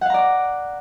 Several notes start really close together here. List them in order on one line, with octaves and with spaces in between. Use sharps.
F#5 F5 A#5 D5 D6